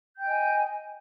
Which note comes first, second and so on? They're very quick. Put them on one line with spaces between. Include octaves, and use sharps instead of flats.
G6 G5 D#5 G#5